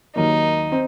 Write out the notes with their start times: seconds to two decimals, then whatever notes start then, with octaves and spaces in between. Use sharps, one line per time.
0.16 D#2 D#3 F#3 A#3 D#4
0.72 C4